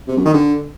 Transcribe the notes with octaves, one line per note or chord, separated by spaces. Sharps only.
C3
F#2
D#3
D3